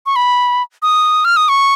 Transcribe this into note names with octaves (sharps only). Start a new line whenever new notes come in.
C#6
B5
D#6
F6
D#6
C#6